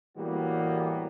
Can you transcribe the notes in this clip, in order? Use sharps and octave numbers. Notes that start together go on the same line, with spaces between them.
A2 E3 G3 A#3 B3 F#4